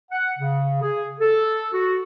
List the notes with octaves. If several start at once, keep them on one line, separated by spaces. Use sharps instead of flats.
F#5
C#3
G#4
A4
F#4